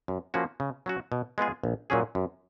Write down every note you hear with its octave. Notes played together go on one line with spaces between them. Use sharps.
F#2
F3 A#3 C#4 F#4
C#3
F#3 C#4 F#4
B2
G#3 B3 F4 G#4
A#1
A#2 F#3 C#4 G#4
F#2